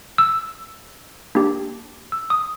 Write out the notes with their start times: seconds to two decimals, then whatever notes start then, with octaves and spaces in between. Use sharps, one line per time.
0.18 E6
1.35 A#3 D4 G4
2.12 E6
2.30 D#6